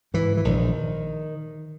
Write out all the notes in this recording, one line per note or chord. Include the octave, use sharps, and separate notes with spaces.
G#2 E3
E3
A#1 D#3